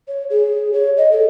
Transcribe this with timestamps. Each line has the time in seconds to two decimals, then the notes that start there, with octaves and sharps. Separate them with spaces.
0.08 C#5
0.30 G#4
0.73 C#5
0.97 D#5
1.12 A4